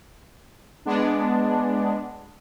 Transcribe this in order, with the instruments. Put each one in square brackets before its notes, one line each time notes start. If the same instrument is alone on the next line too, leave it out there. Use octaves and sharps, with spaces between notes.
[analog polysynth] G#3 B3 D4